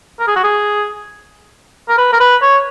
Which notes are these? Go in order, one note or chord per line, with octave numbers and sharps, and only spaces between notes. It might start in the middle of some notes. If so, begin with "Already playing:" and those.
A#4
G#4
F#4
G#4
A#4
B4
A#4
B4
C#5